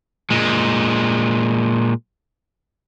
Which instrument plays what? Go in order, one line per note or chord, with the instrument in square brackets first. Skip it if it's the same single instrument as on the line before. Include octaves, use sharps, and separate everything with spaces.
[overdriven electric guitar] A#2 G#3